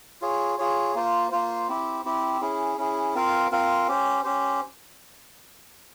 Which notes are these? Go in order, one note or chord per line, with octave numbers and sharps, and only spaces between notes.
F4 G#4 C#5
F4 G#4 C#5
A#3 F4 C5
A#3 F4 C5
C4 E4 G4
C4 E4 G4
C#4 E4 G#4
C#4 E4 G#4
C4 F4 A#4 F5
C4 F4 A#4 F5
C#4 G4 C5
C#4 G4 C5